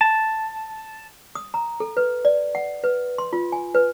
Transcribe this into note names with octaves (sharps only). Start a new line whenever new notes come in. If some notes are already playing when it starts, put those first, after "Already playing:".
A5
D#6
A#5
A4
B4
D5
F#5
B4
C6
F4
G#5
B4